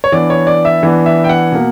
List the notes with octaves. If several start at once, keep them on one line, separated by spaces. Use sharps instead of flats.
C#5
E3 B3 D4 D5
C#5
D5
E5
E3 B3 D4
E5
G5
F#5
B2 A#3